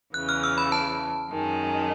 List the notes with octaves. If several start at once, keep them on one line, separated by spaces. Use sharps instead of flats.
E2 C#3 E3 F#6
F6
E6
B5
A5
F#2 D#3 G#3